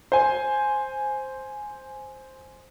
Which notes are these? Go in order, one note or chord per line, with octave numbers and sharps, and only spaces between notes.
C5 G#5